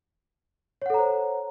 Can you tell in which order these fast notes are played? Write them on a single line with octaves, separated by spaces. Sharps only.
C#5 F#5 A4 A#5 C5